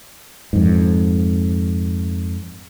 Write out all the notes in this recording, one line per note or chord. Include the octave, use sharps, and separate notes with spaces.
F2 G#2